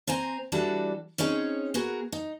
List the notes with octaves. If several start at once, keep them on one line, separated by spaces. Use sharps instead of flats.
C4 C5 G#5 A#5
E3 G3 D4 F#4 A4
C4 C#4 D#4 G#4 C#5
B3 F#4 G#4 A#4
D#4